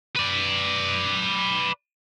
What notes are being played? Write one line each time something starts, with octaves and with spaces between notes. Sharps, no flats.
B4 D5